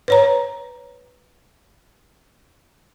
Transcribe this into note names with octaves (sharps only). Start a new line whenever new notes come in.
B4 C#5 A#5